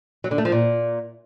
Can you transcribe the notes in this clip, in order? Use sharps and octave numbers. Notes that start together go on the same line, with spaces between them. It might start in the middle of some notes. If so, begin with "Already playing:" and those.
F#3
D3
A3
F3
A#2